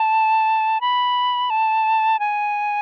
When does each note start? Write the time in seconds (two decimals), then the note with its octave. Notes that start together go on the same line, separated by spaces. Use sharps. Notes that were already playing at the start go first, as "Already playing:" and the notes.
Already playing: A5
0.81 B5
1.50 A5
2.20 G#5